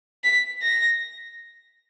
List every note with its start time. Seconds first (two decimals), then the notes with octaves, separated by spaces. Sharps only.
0.24 B6
0.62 A#6